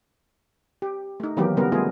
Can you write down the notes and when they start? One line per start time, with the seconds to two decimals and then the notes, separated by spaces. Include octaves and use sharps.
0.82 G4
1.20 A3 D#4
1.37 D#3 E3 F#3 A#3 B3 G4
1.57 C#3 G3 B3 A#4
1.72 G3 A3 B3 F4 G#4